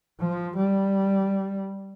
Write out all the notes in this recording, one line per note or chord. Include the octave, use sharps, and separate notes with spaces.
F3
G3